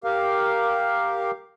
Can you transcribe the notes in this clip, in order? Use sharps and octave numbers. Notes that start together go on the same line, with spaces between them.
G4 A#4 F5